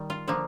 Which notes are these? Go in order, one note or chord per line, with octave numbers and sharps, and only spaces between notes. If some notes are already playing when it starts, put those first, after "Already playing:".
Already playing: D#3 G3
F4
D3 F3 A#3